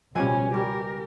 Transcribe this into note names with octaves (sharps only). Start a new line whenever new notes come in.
C#2 B2 F3 G3 C#4 G#5
G3 G4 A#4